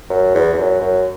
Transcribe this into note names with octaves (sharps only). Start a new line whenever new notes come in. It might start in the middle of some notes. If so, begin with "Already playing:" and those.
F#2
E2
E2
F#2
F#2